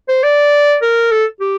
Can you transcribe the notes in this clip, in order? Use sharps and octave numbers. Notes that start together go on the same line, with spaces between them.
C5
D5
A#4
A4
G4